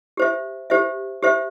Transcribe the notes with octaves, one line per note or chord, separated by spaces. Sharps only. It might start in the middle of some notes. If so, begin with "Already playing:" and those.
G4 C5 E5
G4 C5 E5
G4 C5 E5